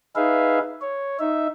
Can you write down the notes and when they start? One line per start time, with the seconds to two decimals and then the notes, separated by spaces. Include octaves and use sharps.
0.16 D#4 G#4 B4 E5 F5
0.81 C#5
1.20 D#4 E5